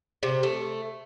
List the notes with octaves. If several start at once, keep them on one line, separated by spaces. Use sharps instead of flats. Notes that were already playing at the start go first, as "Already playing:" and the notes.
C3
A3